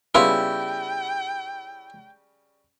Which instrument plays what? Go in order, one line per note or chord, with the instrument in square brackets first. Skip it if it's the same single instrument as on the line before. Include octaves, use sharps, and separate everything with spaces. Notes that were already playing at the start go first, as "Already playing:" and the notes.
[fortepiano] C#3 G3 C#4 [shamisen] B3 F4 [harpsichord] E4 [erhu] G5